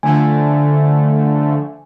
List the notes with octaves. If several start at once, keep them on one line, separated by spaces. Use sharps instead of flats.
D3 F3 A3 G#5